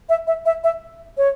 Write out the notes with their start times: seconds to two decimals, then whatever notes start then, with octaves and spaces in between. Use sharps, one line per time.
0.09 E5
0.27 E5
0.46 E5
0.64 E5
1.17 C#5